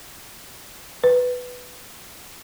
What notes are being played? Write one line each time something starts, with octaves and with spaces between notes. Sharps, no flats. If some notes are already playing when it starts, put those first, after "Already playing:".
B4